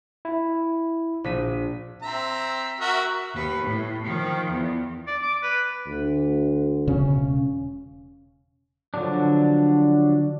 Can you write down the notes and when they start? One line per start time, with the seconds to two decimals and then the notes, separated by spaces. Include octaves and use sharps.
0.25 E4
1.24 A#1 B6 D#7
2.02 C4 E5 A#5
2.80 F#4 A#4 E5
3.34 D#2 B4
3.64 A2
4.04 D#3 F3
4.51 E2
5.07 D5
5.23 D6
5.43 B4
5.87 D2
6.87 E1 C#3 C#4
8.94 D3 F3 F#3 D4